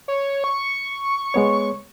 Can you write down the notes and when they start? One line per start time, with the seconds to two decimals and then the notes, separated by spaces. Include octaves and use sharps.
0.08 C#5
0.44 C#6
1.34 G#3 B3 C#5